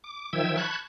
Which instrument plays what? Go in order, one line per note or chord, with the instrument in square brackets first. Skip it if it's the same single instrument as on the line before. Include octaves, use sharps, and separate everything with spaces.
[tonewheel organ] D6
D#3 F3 E5 G5 E6 G#6
A5 B5 C#6 F#6 G#6